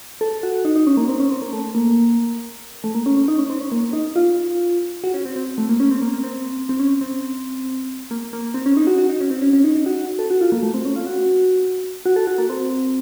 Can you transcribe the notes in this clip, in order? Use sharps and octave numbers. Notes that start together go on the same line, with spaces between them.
A4
F#4
D#4
D#4
C#4
A#3
C4
C#4
C4
A#3
A3
A#3
A3
A#3
C#4
C#4
D#4
C#4
C4
C#4
A#3
D#4
F4
F#4
C#4
C4
C4
A3
A#3
C#4
C4
A#3
A#3
C4
C4
C#4
C4
A#3
A#3
C4
C#4
D#4
F#4
F#4
D#4
C#4
C4
C#4
C#4
D#4
D#4
F#4
F#4
A4
F#4
F4
A#3
A3
C4
C#4
F4
F#4
F#4
A4
F#4
A#3
C4